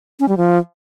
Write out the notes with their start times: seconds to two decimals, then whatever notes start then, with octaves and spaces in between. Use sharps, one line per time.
0.20 C#4
0.28 G3
0.37 F3